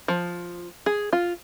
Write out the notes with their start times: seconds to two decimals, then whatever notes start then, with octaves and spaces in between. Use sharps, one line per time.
0.08 F3
0.86 G#4
1.13 F4